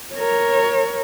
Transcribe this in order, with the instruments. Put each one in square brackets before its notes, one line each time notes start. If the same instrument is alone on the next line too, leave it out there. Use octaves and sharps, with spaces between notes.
[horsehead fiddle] A#4 C#5